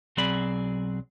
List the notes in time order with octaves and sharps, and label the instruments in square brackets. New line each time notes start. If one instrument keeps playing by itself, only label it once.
[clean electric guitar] B1 F#3 C4 G#4 D5 B5